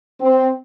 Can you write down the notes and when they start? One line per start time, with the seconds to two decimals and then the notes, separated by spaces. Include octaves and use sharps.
0.20 C4